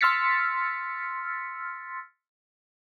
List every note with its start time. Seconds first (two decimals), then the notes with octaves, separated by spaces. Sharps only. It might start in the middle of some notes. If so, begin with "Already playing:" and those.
0.01 C6 E6 F6 A6 B6 C#7